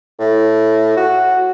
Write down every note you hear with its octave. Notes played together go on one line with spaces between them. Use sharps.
A2
F#4